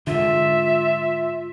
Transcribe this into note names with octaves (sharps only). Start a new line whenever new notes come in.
G#2 D3 F4 E5